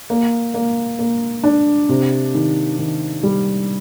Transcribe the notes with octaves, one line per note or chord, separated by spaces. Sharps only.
A#3
A#3
A#3
D4
C3
D#3
D#3
G3